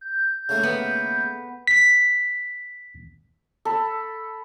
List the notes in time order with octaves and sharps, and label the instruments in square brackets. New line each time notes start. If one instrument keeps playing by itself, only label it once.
[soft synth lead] G6
[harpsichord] C#3 A3 A#3
[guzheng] B3
[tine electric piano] B6
[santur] A4 B5